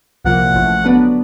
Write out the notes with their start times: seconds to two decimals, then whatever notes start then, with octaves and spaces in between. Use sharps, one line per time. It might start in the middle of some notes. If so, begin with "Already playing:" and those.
0.25 C2 A#2 F3 A#3 F#5
0.54 A1 A2 F3
0.84 D3 F#3 B3 D4